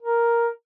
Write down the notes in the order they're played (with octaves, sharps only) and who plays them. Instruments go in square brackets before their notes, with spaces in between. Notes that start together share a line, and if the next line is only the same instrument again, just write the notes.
[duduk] A#4